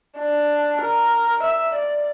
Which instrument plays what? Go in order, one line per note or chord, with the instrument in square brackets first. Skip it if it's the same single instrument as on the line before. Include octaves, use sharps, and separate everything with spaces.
[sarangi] D4
A#4
E5
D5